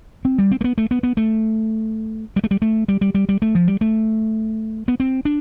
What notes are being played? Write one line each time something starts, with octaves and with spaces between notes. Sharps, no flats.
C4
G3
C4
A3
B3
A3
B3
B3
A3
G3
A3
G3
A3
G3
G3
G3
G3
A3
F3
G3
A3
B3
C4
D4